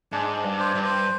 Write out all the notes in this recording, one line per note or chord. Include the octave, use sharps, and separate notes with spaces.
G#2 D4
D4
G2
C5
G2
C5